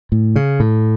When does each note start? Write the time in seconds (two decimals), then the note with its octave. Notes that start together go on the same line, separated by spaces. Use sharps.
0.12 A2
0.36 C#3
0.60 A2